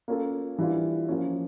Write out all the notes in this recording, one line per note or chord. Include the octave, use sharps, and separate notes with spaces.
A#3 C#4 F4 A4
E3 G3 D4 F4
F3 A#3 C#4